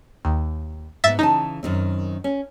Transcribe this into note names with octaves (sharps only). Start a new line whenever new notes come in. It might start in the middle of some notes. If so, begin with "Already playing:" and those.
D#2
G#2 B3 E5 A6 B6
C#3 E3 D#4 A5
F#2 D#3 C4
C#4